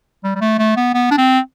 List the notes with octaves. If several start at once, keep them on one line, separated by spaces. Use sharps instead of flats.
G3
G3
A3
A3
B3
B3
D4
C4